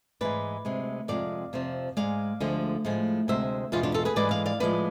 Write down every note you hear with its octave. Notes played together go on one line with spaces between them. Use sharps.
G#2 E3 G#3 B4 D5
D2 C3 G#3
F2 C3 G#3 D5 F5
F2 C3 F3
G#2 G#3 D5 F5
D2 D3 F3 G#3
A2 F3 G#3
D2 C3 G#3 C5 E5
E2 B2 G#3 D4 F4
D4 F4
F4 A4
G#4 B4
G#2 E3 G#3 B4 D5
D5 F5
D5 F5
A2 F3 G#3 B4 D5